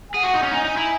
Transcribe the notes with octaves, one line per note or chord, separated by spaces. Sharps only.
G#5
G#4 F#5
F#4
D#4
C#4
D#4 G#5
D#4
E4